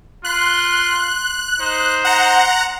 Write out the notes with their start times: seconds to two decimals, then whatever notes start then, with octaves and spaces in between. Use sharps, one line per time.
0.24 F4 C6 F#6
1.59 D#4 C5
2.04 F#5 A#5